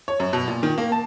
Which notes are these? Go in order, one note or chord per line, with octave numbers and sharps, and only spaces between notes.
C#5
F#2
B2
A#2
D#3
A#3
A5